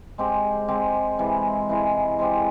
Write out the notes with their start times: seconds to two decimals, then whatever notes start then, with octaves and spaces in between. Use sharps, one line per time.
0.18 G#3 C4 G4
0.68 G#3 C4 G4
1.19 C3 E3 G#3 E4
1.69 C3 E3 G#3 E4
2.19 G#3 C4 G4